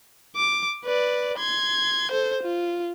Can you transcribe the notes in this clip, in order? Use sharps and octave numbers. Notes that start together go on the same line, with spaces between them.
D6
B4 D5
C6 G#6
A4 C5
F4